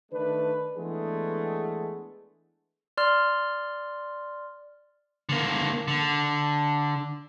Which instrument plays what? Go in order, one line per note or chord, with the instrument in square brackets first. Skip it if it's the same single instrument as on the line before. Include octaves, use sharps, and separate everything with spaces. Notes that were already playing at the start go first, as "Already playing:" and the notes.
[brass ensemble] D#3 A3 D4 B4
E3 G#3 A3 B3 D4 G#4
[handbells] D5 C6 F6
[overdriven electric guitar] D3 A#3
D3